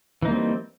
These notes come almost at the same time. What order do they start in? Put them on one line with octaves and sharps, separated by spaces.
E3 D#4 A#3 G3 C4